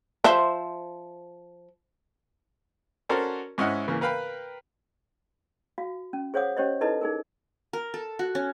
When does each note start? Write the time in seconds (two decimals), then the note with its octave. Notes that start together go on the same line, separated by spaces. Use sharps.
0.24 F3 C5 E5
3.09 C#4 F#4 A4 A#4 C5 D5
3.58 G#2 C#4 E4 D#5 F#5 F6
3.88 C#3 E3 A#3
4.01 A#4 B4 F5 G5 B5
5.78 F#4 F5
6.13 C#4
6.34 G#4 C5 C#5 F5 F#5 D#6
6.57 C#4 G4 C5 C#5 D#5
6.81 D#4 E4 A4 B4 D#5 A5
7.01 D#4 G#4 A#4
7.73 A#4
7.94 A4
8.19 F#4
8.35 C#4